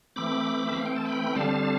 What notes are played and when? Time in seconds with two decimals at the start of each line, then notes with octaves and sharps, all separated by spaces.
0.16 E3 A3 C4 B5 D6
0.66 E5
0.75 E3 A3 C4 F5
0.85 G5
0.95 A5
1.05 G5 B5
1.35 D3 G3 C4 F5 A5